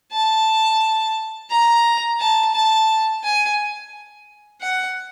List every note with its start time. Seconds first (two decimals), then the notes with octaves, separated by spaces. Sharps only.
0.13 A5
1.51 A#5
2.20 A5
2.54 A5
3.23 G#5
4.61 F#5